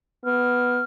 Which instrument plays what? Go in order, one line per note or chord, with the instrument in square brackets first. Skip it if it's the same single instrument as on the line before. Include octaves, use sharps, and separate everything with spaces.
[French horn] B3 [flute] F6